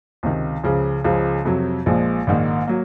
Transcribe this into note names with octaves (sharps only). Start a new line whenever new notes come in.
C#2 C3 D#3
C#2 C#3 F3
C#2 C#3 F3 G#3
F2 C3 F#3
A#1 A#2 F3 G#3
A#1 G#2 D#3 A#3
F#3 A#3